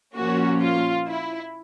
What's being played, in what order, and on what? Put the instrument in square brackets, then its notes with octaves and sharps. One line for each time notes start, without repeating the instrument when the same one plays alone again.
[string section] A#2 F3 A#3 C#4 F#4
F4
E4